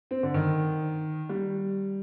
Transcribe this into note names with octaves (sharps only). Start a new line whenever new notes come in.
C4
D3
D#3
G3